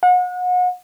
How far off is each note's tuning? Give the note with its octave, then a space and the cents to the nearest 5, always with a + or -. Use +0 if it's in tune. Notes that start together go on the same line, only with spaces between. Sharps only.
F#5 -35